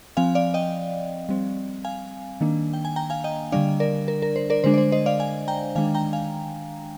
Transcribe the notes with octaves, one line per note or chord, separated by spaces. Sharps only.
F3 C4 F5 G#5
D5 F5
D#5 G5
G3 C4
F5 G#5
D#3 A#3 D4
G5
G#5
G5 A#5
F5 G#5
D#5 G5
D3 G3 D4 D5 F5
A#4 D5
A#4
A#4
C5
A#4 D5
D3 G#3 D4 C5
D5
C5
C5 D#5
D5 F5
F5 G#5
G5 A#5
D#3 G#3 D4 F5 G#5
G5 A#5
F5 G#5